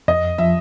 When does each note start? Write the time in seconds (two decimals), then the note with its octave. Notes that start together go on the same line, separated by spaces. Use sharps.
0.08 F2 D#5
0.38 F3 E5